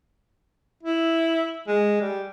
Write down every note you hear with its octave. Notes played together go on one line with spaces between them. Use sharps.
E4
G#3
G3